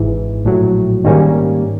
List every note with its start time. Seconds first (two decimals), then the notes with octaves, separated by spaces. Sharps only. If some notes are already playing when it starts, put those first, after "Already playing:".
Already playing: G#1 G#2 E3
0.44 A#1 A2 F#3
1.04 G#2 D#3 G3 A#3 C#4